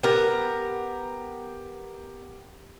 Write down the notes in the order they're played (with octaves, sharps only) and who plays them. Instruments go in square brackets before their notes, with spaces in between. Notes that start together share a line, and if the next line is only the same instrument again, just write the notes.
[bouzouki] B3 A#4 [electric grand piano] G4 G5